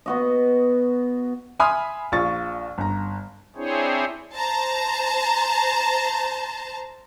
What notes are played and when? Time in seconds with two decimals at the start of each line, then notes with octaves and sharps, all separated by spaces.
0.06 B3 F#4 D#5
1.60 E5 G#5 B5 C6 D#6 F6
2.12 A#1 F4 C#6 A6
2.78 G1 A#5
3.56 C4 D4 E4 G#4 C5 C#5
4.34 C5 A5 A#5